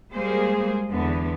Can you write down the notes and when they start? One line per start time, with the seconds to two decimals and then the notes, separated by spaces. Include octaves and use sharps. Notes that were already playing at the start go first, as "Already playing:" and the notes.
0.13 G3 G#3 A#3 G#4 C5
0.89 E2 D3 B3